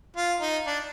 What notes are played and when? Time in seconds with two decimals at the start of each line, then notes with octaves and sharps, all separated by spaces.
0.17 F4
0.40 D#4
0.67 D4